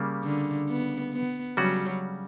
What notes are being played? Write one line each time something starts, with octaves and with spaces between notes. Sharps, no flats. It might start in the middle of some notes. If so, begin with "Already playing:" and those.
Already playing: C#3 G3 A#3
D3
B3
B3
C#3 F#3 G3 C#4 F#4